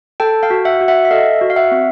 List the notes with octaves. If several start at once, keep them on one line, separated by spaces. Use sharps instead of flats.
A4 G5 A5
F5 G5
F#4
E5 F#5
F#4
E5 F#5
E5
A4 D#5 F5
F#4
F5
E5 F#5
C4